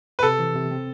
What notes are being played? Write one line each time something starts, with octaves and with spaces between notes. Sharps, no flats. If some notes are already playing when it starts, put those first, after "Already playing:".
B4
C3 A4
E3
C3
C4